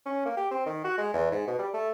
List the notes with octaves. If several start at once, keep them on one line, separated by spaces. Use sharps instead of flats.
C#4
A#3
G4
C4
D#3
F#4
G#3
E2
G#2
B2
G3
A3